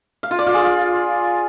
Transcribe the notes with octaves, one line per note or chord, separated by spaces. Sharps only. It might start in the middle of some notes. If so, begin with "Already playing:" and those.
F5
F4
D5
F4
G#4